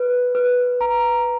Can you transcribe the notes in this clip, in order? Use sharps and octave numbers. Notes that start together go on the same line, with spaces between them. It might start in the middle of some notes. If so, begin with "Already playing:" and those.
Already playing: B4
B4
A#5